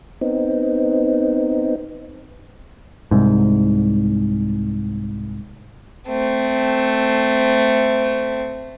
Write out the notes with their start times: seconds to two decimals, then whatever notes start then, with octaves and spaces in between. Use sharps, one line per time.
0.21 B3 C4 D#4
3.11 C2 G#2
6.08 A3 C4